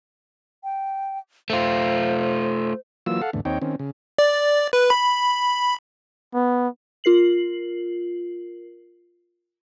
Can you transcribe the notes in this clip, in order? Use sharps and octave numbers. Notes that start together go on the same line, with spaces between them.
G5
A3 F4 C5
E3 F#3 A#3 F4 E6
A4 F5 F#5
E2 A2 D3
D#2 C4 D#4 C#5 G5
D#3 C4 C#4
C#3
D5
B4
B5
B3
F4 A#4 C7 F#7